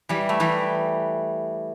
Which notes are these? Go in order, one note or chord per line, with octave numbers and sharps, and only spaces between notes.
E3 G3
A3
E3 G3